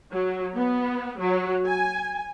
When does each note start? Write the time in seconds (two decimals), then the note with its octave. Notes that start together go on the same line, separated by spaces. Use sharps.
0.13 F#3
0.56 B3
1.20 F#3
1.66 G#5